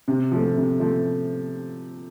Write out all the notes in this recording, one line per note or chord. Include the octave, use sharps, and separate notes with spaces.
C3
F3 A3
C3
F3 A3